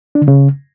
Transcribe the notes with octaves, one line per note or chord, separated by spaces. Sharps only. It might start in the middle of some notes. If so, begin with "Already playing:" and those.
D4
D3
C#3